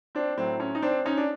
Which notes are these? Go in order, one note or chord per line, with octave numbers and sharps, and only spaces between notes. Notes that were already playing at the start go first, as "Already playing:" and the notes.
C4 D4
A2 F#3 C4
C#4
D#4
C4 D4
C#4 D#4
D4